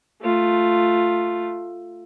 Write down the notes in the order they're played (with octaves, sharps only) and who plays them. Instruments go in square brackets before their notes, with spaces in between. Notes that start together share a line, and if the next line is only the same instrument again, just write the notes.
[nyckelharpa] A3 F4